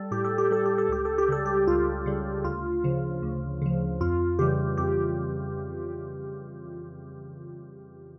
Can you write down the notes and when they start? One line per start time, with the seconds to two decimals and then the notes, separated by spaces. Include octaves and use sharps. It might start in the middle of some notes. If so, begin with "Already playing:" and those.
Already playing: G3 A4
0.11 A2 G4
0.25 A4
0.38 G4
0.51 G3 A4
0.66 G4
0.78 A4
0.89 C#2 G4
1.05 A4
1.18 G4
1.29 C#3 G3 A4
1.45 G4
1.67 C#2 F4
2.06 C#3 G3
2.44 D2 F4
2.84 C#3 F3
3.23 D2
3.62 C#3 F3
4.01 F2 F4
4.39 C#3 E3 G3 G4
4.78 F2 G4